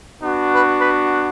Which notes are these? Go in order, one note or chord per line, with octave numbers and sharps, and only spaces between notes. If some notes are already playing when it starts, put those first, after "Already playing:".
B3 D4 F#4
B4
B4